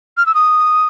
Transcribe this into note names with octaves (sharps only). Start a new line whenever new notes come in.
F6
E6
D#6